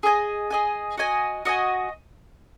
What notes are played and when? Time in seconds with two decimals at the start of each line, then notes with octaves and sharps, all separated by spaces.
0.03 G#4 D#5 G#5
0.51 G#4 D#5 G#5
0.97 F#4 D#5 G#5
1.45 F#4 D#5 G#5